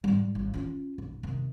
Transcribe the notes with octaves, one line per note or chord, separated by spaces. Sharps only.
G#2 G3
A1
C#4 F4
B1
C3 D#3